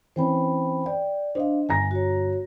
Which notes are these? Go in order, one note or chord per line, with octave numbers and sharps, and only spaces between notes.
E3 C4 C#4 C5 G5 B5
D5 G5
D4 C5 D#5 F5
G1 G#5 A#5 A#6
F#4 C#5